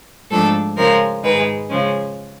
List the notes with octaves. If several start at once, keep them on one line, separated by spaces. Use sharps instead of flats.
G#2 F3 A3 D4 A4
C#3 F3 G#3 A#4
G#2 D#3 G#3 B4
C#3 F3 G#3 C#4